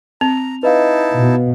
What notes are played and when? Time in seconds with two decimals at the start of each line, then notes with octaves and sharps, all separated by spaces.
0.21 C4 A#5 F7
0.63 D#4 E4 B4 D#5 F5 A5
1.15 B2